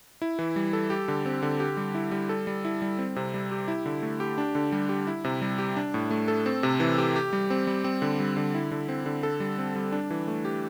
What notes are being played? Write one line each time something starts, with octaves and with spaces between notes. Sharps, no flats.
E4
E3
G3
A4
G4
D3
C4
D3
G4
G3
E4
G3
A4
G3
E4
G3
C4
C3
G3
G4
E4
D3
A3
G4
D4
D3
G3
G4
E4
C3
G3
G4
D4
A2
A3
A4
C4
C3
E3
G4
G4
G3
C4
G3
C4
D3
G3
D3
E4
D3
C4
D3
A4
G3
C4
G3
D4
E3
A3
G4